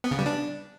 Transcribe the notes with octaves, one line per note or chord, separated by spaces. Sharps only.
B3
C#3
G3
D4